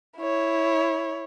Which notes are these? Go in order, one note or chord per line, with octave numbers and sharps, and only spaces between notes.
E4 C#5